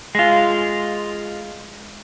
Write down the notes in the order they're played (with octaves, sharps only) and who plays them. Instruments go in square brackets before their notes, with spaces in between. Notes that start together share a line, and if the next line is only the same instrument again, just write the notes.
[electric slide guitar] G#3 F4